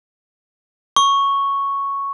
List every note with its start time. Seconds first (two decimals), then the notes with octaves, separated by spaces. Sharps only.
0.96 C#6